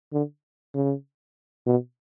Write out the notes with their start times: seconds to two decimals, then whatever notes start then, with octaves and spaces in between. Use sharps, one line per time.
0.13 D3
0.74 C#3
1.67 B2